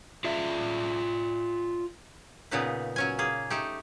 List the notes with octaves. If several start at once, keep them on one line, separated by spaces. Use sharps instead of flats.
F4 D5 E5
A#2 C#3 B3 D#4 B4
F#3 C#4 G#5
A#3 G#4
A3 D#4 G4